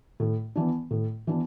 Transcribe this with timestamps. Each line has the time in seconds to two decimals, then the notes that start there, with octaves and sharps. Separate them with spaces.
0.20 A2
0.55 E3 B3 D4
0.91 A2
1.27 E3 B3 D4